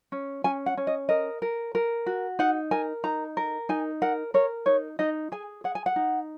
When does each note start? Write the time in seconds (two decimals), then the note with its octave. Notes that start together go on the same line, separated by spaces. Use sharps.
0.12 C#4
0.44 C#4 G#5
0.66 F#5
0.77 C#4
0.87 D#5
1.09 A#4 D#5
1.42 A#4
1.75 A#4
2.06 F#4
2.39 D#4 F#5
2.71 A#4 G#5
3.04 D#4 A#5
3.37 A#4
3.69 D#4 G#5
4.02 A#4 F#5
4.34 A#4 C#5
4.66 D#4 C#5
4.99 D#4 D#5
5.32 G#4 G#5
5.64 G#4 F#5
5.75 G#5
5.86 F#5
5.96 D#4